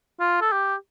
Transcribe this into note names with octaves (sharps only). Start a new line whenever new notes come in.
F4
A4
G4